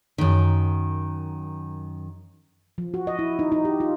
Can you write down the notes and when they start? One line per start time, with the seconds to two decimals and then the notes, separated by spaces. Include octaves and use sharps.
0.18 F#2 D#3
2.78 F3
2.94 F#4
3.07 D#5
3.19 E4
3.39 D#4
3.52 D#4
3.65 G4
3.80 F4